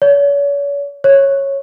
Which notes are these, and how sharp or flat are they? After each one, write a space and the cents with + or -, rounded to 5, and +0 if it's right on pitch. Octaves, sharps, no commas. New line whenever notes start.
C#5 +40
C#5 -10